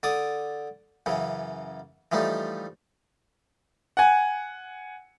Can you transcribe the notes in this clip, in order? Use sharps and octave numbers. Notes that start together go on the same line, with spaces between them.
D3 D5 D6 D#6
F#2 C#3 E3
E3 F3 G3 A3 D#4
F#5 G#5